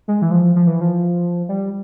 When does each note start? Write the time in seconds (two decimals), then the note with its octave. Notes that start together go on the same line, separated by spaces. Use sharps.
0.08 G#3
0.22 E3
0.31 F3
0.56 F3
0.67 E3
0.81 F3
1.49 G3